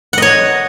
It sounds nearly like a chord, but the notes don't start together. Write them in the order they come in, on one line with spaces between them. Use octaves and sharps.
F#5 D#5 C#5